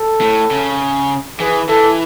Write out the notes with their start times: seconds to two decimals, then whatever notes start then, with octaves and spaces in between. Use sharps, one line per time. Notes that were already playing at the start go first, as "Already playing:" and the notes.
Already playing: A4
0.21 A2
0.51 C#3
1.40 E3 G#4
1.69 E3 A4